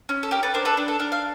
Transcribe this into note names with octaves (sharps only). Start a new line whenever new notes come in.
C#4
A4
G4 A#4
A4 B4
D4 A#4 C5
A4 B4
D4
A4
D4 A#4
F5